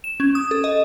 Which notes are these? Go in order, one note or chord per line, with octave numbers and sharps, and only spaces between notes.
E7
C#4
D#6
A4
D#5